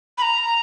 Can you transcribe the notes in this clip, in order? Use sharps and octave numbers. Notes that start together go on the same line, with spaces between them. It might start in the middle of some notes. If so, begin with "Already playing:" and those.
B5
A#5